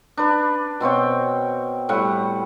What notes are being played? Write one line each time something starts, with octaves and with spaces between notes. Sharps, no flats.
D4 B4
B2 C4 C#5 G5
A2 G3 F#5